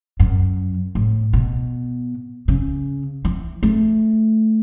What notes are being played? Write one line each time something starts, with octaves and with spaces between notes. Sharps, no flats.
F#2
A2
B2
C#3
E3
A3